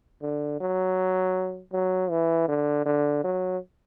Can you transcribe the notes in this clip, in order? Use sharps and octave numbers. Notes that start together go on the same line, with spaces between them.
D3
F#3
F#3
E3
D3
D3
F#3